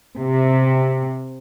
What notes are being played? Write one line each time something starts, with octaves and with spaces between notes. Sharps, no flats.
C3